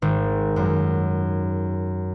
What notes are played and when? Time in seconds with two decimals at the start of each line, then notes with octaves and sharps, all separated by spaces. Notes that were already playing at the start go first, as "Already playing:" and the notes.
0.02 G#1
0.56 F#2